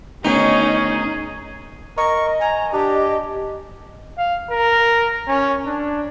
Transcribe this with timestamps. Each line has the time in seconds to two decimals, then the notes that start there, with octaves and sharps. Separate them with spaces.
0.25 D2 D#3 B3 C#4 D#4 G#4
1.98 A#4 D#5 C#6
2.41 G#5 A#5
2.72 D4 G4
4.18 F5
4.51 A#4
5.27 C#4
5.66 D4